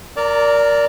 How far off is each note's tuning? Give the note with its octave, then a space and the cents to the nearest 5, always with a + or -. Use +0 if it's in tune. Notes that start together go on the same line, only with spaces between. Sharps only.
A#4 +0 D5 -15 A#5 -30